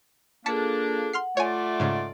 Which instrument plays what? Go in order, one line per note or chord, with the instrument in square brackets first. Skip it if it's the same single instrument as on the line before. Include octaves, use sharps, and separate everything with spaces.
[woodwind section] A#3 D4 [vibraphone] F4 G#4 A4 [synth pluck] A5 B6 C#7
[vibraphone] F#5 [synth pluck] C6 F6 C7
[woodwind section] A3 F4 D5 [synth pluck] C#5 G#5
[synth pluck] G#2 C#3